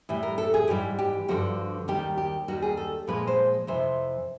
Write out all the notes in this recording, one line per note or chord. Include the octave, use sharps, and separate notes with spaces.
A2 E3 G3
A#4
A4
G#4
G#2 E3 G3 G4
G4
G2 D3 F3 F#4
D#2 D#3 G3 G4
G4
D#2 D#3 G3 F#4
G#4
A4
A#2 F3 G#3 B4
C5
F2 C3 E3 C5